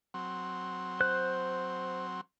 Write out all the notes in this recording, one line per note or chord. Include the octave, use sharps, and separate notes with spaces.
F#3 C4
C5 F#6